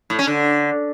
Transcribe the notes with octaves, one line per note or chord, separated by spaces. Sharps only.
A2
C#4
D3